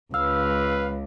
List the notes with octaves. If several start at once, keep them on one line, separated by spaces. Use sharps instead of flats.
C#2 B4 F5 E6